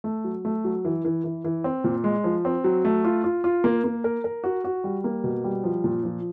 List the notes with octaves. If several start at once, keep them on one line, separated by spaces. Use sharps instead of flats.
A3
F#3
A3
F#3
E3
E3
E3
E3
C4
A#2
G#3
F3
C4
F#3
A3
F4
F4
F4
A#3
A#3
A#4
A#4
F#4
F#4
G3
A#3
B2
G3
F3
A#2
F3